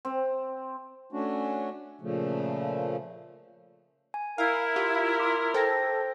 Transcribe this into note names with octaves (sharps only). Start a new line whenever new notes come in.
C4
A3 C#4 D4 F#4
A#2 C#3 F3 A3
G#5
E4 A#4 F5
F4 G4
C6 D6
A4 C5 G5 A#6